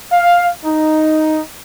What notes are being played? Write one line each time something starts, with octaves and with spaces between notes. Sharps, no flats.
F5
D#4